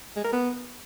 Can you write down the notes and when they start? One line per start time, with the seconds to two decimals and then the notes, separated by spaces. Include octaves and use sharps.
0.16 G#3
0.24 A#4
0.32 B3